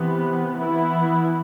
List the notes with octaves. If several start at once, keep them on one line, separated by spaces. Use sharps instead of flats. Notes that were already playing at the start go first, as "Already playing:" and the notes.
Already playing: C3 E3 B3
E3 B3 E4